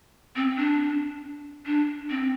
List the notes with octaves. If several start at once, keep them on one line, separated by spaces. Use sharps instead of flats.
C4
D4
D4
C4